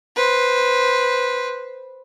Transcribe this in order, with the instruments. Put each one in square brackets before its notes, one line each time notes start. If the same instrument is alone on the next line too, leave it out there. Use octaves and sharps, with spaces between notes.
[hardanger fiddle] B4 C5